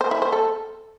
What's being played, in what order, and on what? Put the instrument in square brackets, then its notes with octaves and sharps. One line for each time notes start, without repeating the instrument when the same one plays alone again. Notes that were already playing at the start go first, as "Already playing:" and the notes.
[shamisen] C5
E4
C5
A4